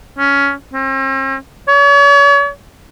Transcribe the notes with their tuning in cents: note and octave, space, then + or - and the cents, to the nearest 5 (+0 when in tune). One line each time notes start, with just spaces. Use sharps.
C#4 +15
C4 +45
C#5 +40